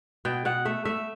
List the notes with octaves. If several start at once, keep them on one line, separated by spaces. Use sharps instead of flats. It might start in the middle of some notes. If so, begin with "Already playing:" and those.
B2 G5
B2 F#5
A3 E5
A3 E5